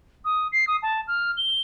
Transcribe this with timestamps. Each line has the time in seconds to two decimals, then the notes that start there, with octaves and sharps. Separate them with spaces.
0.25 D#6
0.52 C7
0.67 D#6
0.82 A5
1.07 F6
1.37 G7